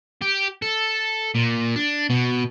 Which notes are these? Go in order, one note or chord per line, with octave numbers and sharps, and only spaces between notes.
G4
A4
A#2
D4
B2